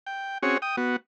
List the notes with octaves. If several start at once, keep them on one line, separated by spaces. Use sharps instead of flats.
G5
C4 C#4 F#4 G#4 C#5
G5 D#6
B3 F#4